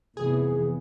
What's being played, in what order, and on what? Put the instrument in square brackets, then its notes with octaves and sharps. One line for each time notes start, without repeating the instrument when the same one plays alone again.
[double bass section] F1 E3 B3 [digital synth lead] G#4